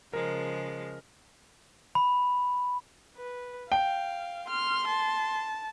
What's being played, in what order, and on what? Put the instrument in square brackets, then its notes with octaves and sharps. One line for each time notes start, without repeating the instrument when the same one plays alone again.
[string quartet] C#3 F3 G#3 [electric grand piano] A#4
[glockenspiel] B5
[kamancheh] B4
[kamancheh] F5 [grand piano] G5
[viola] C6 [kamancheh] F6
[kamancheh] A5